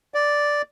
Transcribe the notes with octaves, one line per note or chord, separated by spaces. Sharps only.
D5